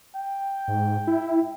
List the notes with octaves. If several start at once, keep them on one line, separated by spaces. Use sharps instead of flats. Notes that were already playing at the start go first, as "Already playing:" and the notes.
G5
G#2
E4